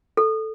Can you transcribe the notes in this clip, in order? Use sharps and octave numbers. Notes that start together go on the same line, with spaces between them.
A4